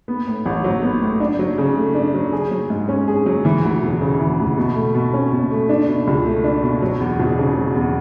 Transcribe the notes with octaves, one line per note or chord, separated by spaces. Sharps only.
B3
A2
A1
F#3
B3
A2
D4
F#3
C#3
A3
D4
F#3
G#4
F#3
G#2
C#4
G#4
F#3
E3
D2
E1
C#3
E3
D2
B2
A3
B2
C#4
B2
A3
D4
B2
C#2
A3
D4
B2
F#3
E2
E1
C#3
F#3
E2